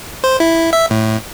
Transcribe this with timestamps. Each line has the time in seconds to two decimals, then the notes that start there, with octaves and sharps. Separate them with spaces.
0.24 C5
0.40 E4
0.73 E5
0.90 A2